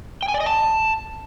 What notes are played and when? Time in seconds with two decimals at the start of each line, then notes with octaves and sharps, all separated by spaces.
0.23 G5
0.28 G#5
0.34 D5
0.40 D#5
0.46 A5